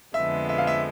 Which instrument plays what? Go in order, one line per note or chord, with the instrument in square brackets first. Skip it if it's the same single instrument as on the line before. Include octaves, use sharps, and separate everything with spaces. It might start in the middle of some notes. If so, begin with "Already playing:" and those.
[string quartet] F2 D3 F3 G#3 B3 [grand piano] E5
[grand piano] E5
F5
E5